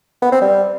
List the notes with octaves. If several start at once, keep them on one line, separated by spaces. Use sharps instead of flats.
B3
C4
G3